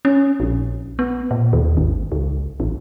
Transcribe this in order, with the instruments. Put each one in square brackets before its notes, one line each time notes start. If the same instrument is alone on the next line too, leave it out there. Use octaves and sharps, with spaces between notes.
[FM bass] C#4
A#1
B3
A#2
D#2
G#1
C#2
A1